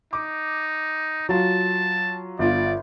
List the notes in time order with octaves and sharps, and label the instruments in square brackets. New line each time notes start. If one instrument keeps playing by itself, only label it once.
[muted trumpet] D#4 [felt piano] D6
[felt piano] F#3 F4 [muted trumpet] A5
[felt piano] G1 F4 [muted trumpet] D5